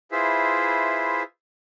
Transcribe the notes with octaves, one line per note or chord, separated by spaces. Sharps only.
E4 F4 G#4 B4 C5 E5